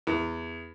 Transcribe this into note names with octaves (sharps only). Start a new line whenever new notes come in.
E2